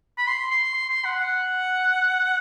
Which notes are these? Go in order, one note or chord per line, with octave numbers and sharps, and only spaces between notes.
B5
C6
C6
C6
C6
F#5
F#5